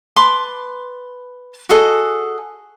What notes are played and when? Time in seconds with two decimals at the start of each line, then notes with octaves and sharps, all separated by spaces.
0.16 B4 A5 C6 D6
1.69 F#4 G#4 A4 D#5